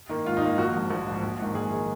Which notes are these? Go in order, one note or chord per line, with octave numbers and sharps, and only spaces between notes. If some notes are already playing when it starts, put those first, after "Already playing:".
D#3 A#3
G#2 F4
D#4
D#3 A#3
A#1 F#4
G#2 F3
A#1
G#2 F3
A#1
G#2 D#3
A#1 G#4
D#3